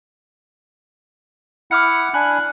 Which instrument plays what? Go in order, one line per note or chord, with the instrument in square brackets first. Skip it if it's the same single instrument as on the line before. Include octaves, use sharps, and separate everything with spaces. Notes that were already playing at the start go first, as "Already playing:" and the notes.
[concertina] E4 F#5 [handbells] D6 F6 C#7
[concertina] D4 G#5 B5 [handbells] F#6